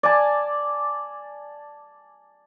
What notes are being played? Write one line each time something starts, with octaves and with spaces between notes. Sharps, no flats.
D5 G#5 A5